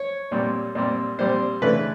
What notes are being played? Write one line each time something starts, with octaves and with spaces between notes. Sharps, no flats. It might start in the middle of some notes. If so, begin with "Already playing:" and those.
Already playing: C#5
A#2 G3 C4
A#2 G3 C4
A#2 G3 C4 C5
D2 C#3 E3 A3 D4 B4